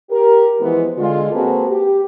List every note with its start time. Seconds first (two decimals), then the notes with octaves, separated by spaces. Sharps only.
0.10 G4 A#4
0.60 E3 F3 G#3 B3
0.98 D3 G#3 F4
1.33 A#3 C4 F#4 G#4 A4 B4
1.68 G4